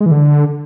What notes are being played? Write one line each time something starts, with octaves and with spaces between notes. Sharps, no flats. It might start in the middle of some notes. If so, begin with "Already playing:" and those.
G#3
E3
D3